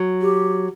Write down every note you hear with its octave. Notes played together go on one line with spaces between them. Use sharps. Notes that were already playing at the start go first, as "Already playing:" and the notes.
Already playing: F#3
G4